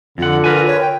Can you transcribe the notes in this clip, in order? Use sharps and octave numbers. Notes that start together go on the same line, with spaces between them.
F2 D3 F4 F#5
F4 A#4 B4 G#5
C#5
G5